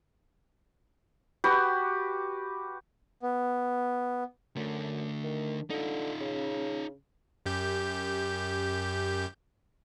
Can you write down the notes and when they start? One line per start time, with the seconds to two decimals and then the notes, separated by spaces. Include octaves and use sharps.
1.44 F#4 G4 B4
3.22 B3
4.56 F#2 D3 A3
5.24 D#3
5.70 D3 D#4 F4
6.21 C#3
7.46 F#2 G4 G6